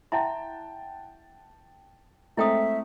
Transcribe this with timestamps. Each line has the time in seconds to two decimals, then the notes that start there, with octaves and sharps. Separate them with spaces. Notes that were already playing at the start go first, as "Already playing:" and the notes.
0.12 E4 E5 F#5 G5 A5 C6
2.37 G#3 A3 C4 E4 E5 G5 D#6